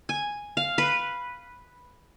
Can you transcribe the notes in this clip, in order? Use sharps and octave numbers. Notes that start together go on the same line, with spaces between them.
G#5
F5
B4